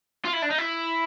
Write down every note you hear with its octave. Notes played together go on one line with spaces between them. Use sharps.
F4
E4
D4
D#4
E4